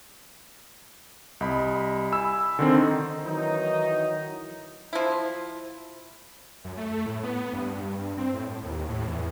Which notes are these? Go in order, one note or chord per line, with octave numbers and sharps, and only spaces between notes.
C2 D#5 B5
G#5 B5 E6
D3 D#3 C4
D#4
D#3 E3 F#3 D#4
F3 E4
F#2
A3
A2
B3
G2
C4
A2
D#2
A2
E2